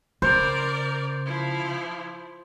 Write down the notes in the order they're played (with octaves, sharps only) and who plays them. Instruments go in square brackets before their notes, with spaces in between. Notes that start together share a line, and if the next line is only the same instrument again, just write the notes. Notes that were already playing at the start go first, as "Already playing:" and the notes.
[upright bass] C#3 [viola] A#4 D5 [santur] C5
[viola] F3 E4